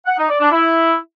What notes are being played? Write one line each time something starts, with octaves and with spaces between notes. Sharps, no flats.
F#5
D#4
D5
D4
E4